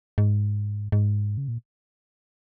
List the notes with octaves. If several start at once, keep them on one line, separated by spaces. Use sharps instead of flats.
G#2
G#2
C#3
A#2